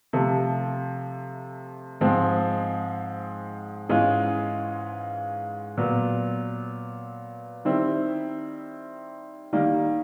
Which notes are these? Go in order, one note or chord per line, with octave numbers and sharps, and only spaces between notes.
C3 F3 A3
G#2 F3 G#3 C4
G#2 E3 G#3 C#4 F4
A#2 F#3 B3
D#3 G3 C4 E4
D#3 G3 A#3